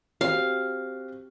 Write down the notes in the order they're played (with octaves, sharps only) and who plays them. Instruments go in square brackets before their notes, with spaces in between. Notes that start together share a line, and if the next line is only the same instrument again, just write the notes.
[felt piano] C4 F#4 G4 [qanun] F5